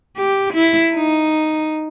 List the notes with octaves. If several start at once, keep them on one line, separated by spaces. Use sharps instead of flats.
G4
E4
D#4